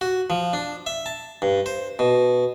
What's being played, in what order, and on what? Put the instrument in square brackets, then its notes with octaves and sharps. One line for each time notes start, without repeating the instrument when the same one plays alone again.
[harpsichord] F#4
F3
D4
E5
A5
G2
C5
B2